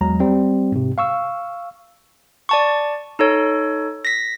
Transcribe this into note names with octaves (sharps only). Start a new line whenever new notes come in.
E2 F#3 G#3 A#5
G3 C4
G#2 C3
F5 C#6 E6
D5 A5 C#6
D#4 A4 C#5
A#6 B6